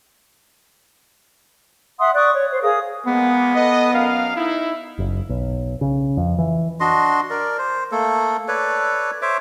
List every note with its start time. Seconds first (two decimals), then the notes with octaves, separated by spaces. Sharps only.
2.00 E5 F#5 C6 D#6
2.15 D5 C#6 D#6 F#6
2.35 C#5
2.50 C5
2.63 G#4 A#4 F5 D#6
3.06 G#3 A#3 B3
3.55 A4 B4 D#5
3.93 F#2 A#4 F5
4.36 D#4 E4
4.98 F#1
5.29 B1
5.81 C#3
6.17 F2
6.38 E3
6.80 D4 F#4 D#5 C6
7.30 A#4 D5
7.58 C5
7.92 A3 A#3 A4
8.48 A4 B4 C#5 D5
9.22 C5 C#5 E5 D6